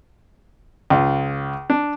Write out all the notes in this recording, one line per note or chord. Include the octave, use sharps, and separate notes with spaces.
C#2 F4
D4